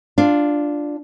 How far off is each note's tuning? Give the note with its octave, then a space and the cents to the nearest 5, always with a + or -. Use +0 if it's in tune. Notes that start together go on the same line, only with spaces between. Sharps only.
D4 +0 F4 +0